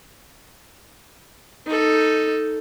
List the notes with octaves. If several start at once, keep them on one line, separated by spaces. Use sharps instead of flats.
D#4 A4